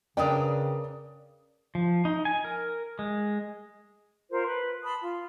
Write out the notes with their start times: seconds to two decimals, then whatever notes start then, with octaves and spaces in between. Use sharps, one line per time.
0.17 C#3 C#4 D4 A#4 B4 D5 G5 D#6
1.75 F3
2.05 D#4
2.25 G#5
2.44 A#4
2.99 G#3
4.30 F4 A#4 C5
4.45 B4
4.83 A5 B5 C6 D#6
5.01 F4